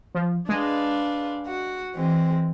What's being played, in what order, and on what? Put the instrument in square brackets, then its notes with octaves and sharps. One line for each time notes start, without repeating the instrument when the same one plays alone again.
[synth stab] F3
[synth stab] G#3 [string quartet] D4 B4 F5
[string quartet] F#4
E3 G#3 C4